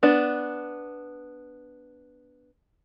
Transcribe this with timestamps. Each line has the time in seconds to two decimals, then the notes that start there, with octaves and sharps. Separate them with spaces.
0.03 B3 D4